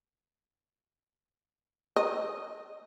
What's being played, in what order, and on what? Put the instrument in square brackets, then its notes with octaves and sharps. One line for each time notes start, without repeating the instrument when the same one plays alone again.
[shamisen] D#5